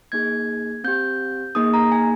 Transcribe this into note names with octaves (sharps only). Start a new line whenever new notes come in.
A#3 D#4 G#4 G#6
C4 G4 G6
A#3 D#4 G#4 D#6
A#5
G#5